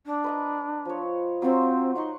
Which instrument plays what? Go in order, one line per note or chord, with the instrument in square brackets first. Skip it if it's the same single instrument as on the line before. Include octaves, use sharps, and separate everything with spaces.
[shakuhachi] D4
[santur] B4 D#5 A#5
F3 C#5
[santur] F#3 F4 C5 [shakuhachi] C4
[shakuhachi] D#4 [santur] F#5 C6 C#6